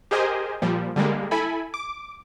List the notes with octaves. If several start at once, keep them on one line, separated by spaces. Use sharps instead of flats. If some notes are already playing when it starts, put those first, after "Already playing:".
G4 G#4 A#4 C5 D#5 G#5
A#2 F3 G3
D3 G3 G#3 A#3
E4 A4 G#5 B5
D6